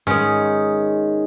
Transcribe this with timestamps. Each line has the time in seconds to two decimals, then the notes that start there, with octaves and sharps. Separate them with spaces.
0.07 G#2 D#3 C#4